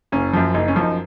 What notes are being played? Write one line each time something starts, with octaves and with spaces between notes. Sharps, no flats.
F#1 C#4
F#2 F3
F#1 D#4
C#4
F#2 F3
D#4